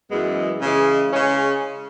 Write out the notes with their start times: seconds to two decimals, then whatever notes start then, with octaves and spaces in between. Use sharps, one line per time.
0.11 F#2 E3 G#3 B3
0.61 C#3 E3 G#3
1.13 C#3 G#3 C#4